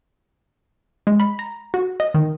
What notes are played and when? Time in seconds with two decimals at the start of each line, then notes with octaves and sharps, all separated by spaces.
1.07 G#3
1.20 B5
1.39 A#5
1.74 F#4
2.00 D#5
2.14 D#3